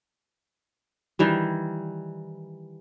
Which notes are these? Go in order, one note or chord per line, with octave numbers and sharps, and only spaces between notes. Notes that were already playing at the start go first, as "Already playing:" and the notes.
D#3 E3 G3